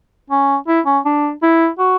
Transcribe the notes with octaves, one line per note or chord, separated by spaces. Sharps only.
C#4
E4
C#4
D4
E4
F#4